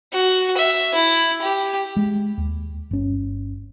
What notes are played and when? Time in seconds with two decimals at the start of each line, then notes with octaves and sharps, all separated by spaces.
0.13 F#4
0.57 E5
0.94 E4
1.42 G4
1.96 G#3
2.37 D#2
2.91 G1 C#4